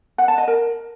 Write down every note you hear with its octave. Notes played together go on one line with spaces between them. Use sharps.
F#5
A5
D#5
A#4